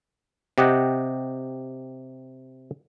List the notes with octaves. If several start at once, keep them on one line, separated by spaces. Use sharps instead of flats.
C3 G4 D#5 F#5